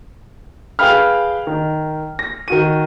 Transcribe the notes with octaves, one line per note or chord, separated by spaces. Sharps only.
G#4 B4 F5 G5 B5 F6
D#3
A#6
D#3 F#4 D#7